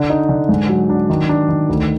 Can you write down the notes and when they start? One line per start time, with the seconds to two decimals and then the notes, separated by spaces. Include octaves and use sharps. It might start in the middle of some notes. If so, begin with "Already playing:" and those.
Already playing: D3
0.10 D#4
0.29 D3
0.49 G#2
0.69 F#3
0.89 D4
1.10 D#3
1.29 D4
1.49 D#3
1.69 D2